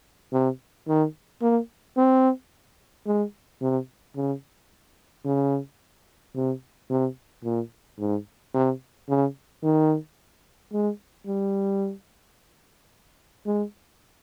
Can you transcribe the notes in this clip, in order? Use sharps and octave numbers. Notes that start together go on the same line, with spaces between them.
C3
D#3
A#3
C4
G#3
C3
C#3
C#3
C3
C3
A#2
G#2
C3
C#3
D#3
G#3
G3
G#3